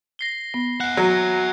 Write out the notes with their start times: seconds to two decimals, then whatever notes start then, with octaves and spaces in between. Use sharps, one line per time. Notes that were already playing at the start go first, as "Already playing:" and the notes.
0.19 A#6 C7 G7
0.54 B3
0.80 E5 F#5 F#6
0.97 F#3